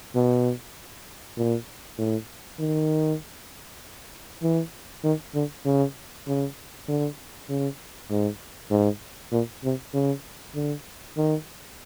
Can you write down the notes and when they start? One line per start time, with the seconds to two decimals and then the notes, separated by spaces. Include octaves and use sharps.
0.15 B2
1.37 A#2
1.98 A2
2.59 D#3
4.42 E3
5.04 D#3
5.34 D3
5.65 C#3
6.27 C#3
6.88 D3
7.49 C#3
8.09 G#2
8.71 G#2
9.32 A#2
9.64 C3
9.93 C#3
10.55 D3
11.16 D#3